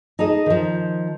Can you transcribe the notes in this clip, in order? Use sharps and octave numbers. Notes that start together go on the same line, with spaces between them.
D#4 G#4 A4 D#5
D#3 F3